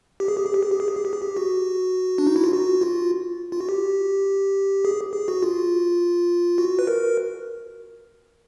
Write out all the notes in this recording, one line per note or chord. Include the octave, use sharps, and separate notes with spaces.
G4
G#4
G4
G#4
G4
G#4
G4
G#4
G4
G#4
G4
G#4
G4
F#4
D4
D#4
E4
F4
F#4
F4
F4
F#4
G4
G#4
G#4
F#4
F4
F#4
B4
A#4